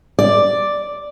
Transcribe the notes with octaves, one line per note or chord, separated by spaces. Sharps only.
D5